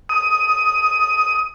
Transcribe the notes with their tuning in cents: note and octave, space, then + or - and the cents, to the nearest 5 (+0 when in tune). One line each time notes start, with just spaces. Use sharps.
D#6 +10